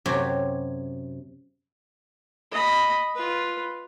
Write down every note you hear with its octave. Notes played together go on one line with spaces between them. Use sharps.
F#2 C3 G4 C#5
D#5 B5
F4 B4